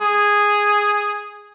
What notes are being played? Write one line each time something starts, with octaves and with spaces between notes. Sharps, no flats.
G#4